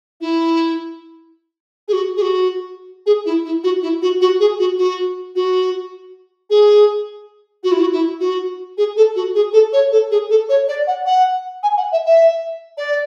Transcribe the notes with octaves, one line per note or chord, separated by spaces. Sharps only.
E4
G#4
F#4
G#4
F#4
G#4
E4
E4
F#4
E4
F#4
F#4
G#4
F#4
F#4
F#4
G#4
F#4
E4
F#4
E4
F#4
G#4
A4
F#4
G#4
A4
C#5
A4
G#4
A4
C#5
D5
F#5
F#5
G#5
F#5
E5
E5
D5